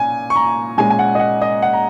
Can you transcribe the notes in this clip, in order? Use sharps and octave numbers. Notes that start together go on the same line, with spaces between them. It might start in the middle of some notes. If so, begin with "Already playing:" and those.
Already playing: A#2 C#4 G#5
C#6
A#5
A#2 G#3 C#4 G#5
G#5
F#5
D#5
F#5
D#5
F#5
A#5